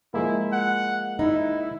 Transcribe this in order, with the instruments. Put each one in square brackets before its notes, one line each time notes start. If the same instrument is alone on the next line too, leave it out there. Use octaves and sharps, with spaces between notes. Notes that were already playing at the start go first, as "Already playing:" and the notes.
[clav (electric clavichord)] F3 G#3 A#3 [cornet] E4
[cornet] F#5
[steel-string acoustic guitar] D#4 [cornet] E4